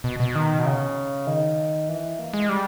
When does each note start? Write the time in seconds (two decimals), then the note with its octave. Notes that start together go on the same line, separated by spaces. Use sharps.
0.04 B2
0.20 B2
0.35 D#3
0.59 B2
0.66 C#3
1.27 D#3
1.89 E3
2.19 A#3
2.34 G#3
2.49 G3